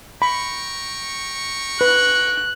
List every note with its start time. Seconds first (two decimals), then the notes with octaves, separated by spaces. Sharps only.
0.22 G5 A#5 B5 C#6
1.81 B4 F#6